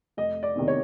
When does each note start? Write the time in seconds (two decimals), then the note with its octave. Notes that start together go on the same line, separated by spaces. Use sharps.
0.17 F1 D#5
0.43 D5
0.55 E2 C3 D#3
0.68 C#5